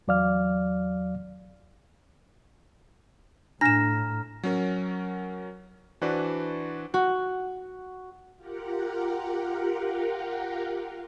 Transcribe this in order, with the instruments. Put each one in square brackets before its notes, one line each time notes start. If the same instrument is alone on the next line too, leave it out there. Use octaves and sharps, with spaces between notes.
[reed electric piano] E2 F#3 D5 F5 F6
[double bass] A2 [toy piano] D4 [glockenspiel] A#5 F6 [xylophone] A#6 E7
[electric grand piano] F#3 C#4 A#4
E3 D4 F#4 B4 C5 D5
[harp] F#4
[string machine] F4 G4 A#4 F#5